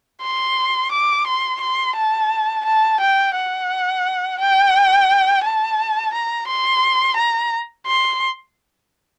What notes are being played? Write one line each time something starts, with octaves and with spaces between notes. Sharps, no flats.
C6
D6
C6
C6
A5
A5
G5
F#5
G5
A5
A#5
C6
A#5
C6